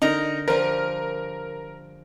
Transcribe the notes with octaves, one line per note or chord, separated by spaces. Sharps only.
D3 D#4 A#4 A#5
F3 G3 A#4